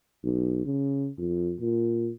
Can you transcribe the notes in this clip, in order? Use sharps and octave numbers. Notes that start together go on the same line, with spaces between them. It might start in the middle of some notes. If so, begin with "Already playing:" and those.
B1
C#3
F2
A#2